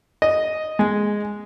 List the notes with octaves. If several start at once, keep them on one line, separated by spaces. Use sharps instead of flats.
D#5
G#3